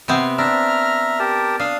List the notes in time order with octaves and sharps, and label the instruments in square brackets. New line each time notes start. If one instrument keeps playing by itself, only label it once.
[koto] C3 B3 C4
[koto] D4 [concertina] E5 A#5 F6
[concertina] G4 A#4 A5
[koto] D4 [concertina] F5 D#6